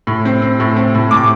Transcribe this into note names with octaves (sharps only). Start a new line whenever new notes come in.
A2
C4
C4
A2
C4
A2
A2 D6